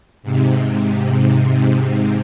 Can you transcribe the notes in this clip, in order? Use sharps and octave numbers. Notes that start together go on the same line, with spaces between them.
G#2 C3